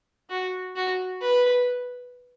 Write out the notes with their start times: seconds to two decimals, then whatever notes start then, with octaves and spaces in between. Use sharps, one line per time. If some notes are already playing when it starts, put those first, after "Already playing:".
0.29 F#4
0.76 F#4
1.21 B4